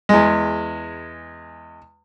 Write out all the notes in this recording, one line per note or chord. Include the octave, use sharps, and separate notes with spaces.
E2 G#3